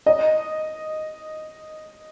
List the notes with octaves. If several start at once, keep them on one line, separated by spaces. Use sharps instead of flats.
D#5